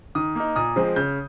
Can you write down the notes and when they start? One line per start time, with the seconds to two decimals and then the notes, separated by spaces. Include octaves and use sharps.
0.15 D#3 D#6
0.35 A#3 D#4
0.56 A#2 D#6
0.76 F3 G#3 C4
0.96 C#3 G6